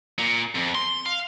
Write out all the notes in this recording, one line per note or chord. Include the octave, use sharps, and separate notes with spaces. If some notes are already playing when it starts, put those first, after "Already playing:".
A#2
F2
C6
F5